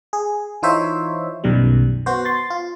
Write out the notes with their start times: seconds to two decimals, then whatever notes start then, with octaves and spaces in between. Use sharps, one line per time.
0.13 G#4
0.63 E3 D#4 F4 C5 C#5 E5
1.44 B1 F#2 B2 D#3 G3
2.06 B3 F#4 C5
2.25 C6 A6
2.50 F4